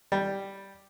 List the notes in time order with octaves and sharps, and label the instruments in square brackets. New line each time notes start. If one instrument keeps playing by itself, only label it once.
[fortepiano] G3